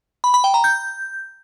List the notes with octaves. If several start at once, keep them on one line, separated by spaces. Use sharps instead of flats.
B5
B5
G5
A#5
G6